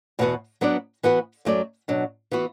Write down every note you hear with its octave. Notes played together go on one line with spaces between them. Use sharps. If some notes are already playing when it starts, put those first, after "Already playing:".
E2 B2 B3 F#4 B4
F#3 B3 D4 B4 D5
E3 B3 F#4 B4
F#2 F#3 A3 F#4 D5
B2 F#3 D4
E3 B3 F#4